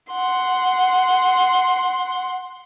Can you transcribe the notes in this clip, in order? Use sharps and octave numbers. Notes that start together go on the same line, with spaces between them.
F#5 C6